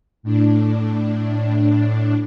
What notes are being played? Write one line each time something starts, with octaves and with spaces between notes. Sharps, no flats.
A2 D4